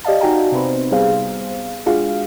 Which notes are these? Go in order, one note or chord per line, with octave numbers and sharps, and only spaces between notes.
G4 D5 D#5 F5 A5
B3 D#4 F#4 G5 G#5 A#5
C3 B3 C4 B4 C5
G3 B3 G#4 C5 F5
G#3 D4 F4 F#4 G#4 F5